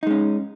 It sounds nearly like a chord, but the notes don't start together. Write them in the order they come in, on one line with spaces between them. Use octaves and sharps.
D#4 G#3 C#4